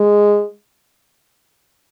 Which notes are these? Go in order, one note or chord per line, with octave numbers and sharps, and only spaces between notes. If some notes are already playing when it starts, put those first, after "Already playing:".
Already playing: G#3